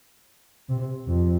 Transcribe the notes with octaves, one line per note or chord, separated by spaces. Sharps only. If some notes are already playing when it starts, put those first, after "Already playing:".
C3
F2